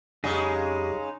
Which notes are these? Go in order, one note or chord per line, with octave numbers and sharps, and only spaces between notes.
F2 C#3 F#3 G#3 D#4 G4 G#4